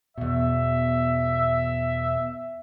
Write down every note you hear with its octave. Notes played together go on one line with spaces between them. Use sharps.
E2 B2 E5